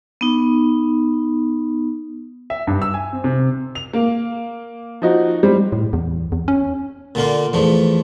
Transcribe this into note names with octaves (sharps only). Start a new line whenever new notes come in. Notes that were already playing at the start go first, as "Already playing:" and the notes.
B3 D#4
E5
G2
E6
G#5
C4
C3
F7
A#3
F3 D#4 F#4
G3 C5
A2
E2
E2
C#4
A#2 D3 A#3 F4
E2 F3 A3